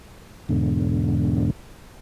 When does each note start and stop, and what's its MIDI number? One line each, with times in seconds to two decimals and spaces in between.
0.49 1.51 40
0.49 1.51 44
0.49 1.51 47
0.49 1.51 50